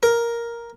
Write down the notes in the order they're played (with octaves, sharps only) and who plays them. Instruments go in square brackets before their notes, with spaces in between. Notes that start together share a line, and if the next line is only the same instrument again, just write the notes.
[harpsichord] A#4